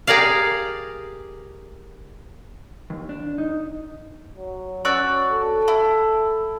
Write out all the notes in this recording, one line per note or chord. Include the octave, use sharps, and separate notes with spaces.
G4 G#4 A#4 D5 F5
D#2
D4
D#4
F#3
C#4 F#4 D5 E6
A4
E4